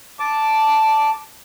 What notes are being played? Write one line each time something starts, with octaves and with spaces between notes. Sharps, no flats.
A5 D6